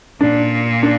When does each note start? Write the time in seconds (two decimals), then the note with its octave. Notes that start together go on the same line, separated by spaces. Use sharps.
0.20 A#2 D4
0.83 D4